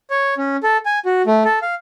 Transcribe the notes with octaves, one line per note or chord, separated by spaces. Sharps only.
C#5
C#4
A4
G#5
F#4
A3
A4
F5